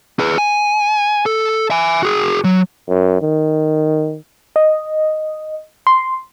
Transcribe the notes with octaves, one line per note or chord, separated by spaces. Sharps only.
G#4 B4
G#5
A4
E5 G#5
F#4 G#4
F#3
F#2
D#3
D#5
C6